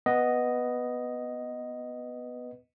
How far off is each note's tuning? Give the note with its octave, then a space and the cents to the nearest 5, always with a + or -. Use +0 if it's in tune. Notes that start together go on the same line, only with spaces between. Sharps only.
B3 +0 B4 +0 D#5 +0